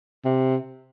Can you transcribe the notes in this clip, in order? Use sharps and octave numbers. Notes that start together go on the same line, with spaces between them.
C3